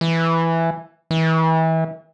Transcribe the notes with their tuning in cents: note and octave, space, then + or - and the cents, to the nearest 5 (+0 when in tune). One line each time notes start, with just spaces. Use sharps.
E3 +5
E3 -30